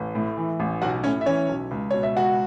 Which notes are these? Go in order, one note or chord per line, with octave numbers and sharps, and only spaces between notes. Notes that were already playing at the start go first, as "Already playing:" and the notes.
Already playing: A1
A2
E3
A1
B1 F#4 F#5
A2 C#4 C#5
E5
E3 C#4 C#5
B1
C#2
B2 C#5
E5
C#2 F#4 F#5